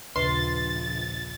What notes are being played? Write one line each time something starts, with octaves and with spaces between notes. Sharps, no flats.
A#1 D#2 C#3 B4 C6 A6